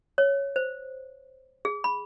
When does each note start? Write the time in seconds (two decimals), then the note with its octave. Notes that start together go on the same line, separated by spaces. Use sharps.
0.18 C#5
0.56 C5
1.65 G#4
1.84 B5